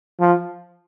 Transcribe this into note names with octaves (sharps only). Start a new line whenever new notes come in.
F3